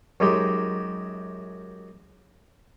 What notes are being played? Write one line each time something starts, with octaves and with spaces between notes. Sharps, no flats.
F#2 G#3 D#4 G4